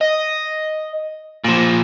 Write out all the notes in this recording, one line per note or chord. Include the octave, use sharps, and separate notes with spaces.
D#5
A#2 F3